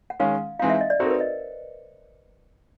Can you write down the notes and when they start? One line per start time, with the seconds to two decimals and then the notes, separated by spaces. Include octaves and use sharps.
0.10 F#5
0.20 D#3 G#3 C#4 F5
0.59 E3 G#3 C4 D#4 F5
0.70 E5
0.81 D#5
0.90 D5
1.00 C4 D#4 F#4 A4 C5
1.06 A#4
1.11 B4
1.21 D#5